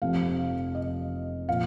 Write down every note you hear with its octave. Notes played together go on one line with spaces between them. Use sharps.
F1 F2 C3 F3 F5
D#5
A#2 F3 F5